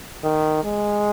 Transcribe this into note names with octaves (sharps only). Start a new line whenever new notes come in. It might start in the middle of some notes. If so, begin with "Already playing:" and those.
D#3
G#3